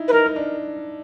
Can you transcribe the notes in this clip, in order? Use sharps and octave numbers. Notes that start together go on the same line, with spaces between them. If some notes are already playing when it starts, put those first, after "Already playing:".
Already playing: D#4 E4
B4
D#4 A#4
D#4
D4